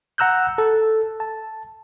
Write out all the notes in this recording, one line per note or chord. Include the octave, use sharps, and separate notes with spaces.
F#5 A#5 E6 F#6 G6
A4
A5